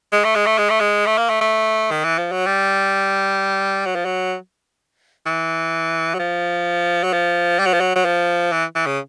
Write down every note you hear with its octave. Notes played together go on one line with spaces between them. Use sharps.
G#3
A3
G#3
A3
G#3
A3
G#3
A3
A#3
A3
A3
D#3
E3
F3
F#3
G3
F#3
F3
F#3
E3
F#3
F3
F#3
F3
G3
F#3
F3
F#3
F#3
F3
E3
E3
C#3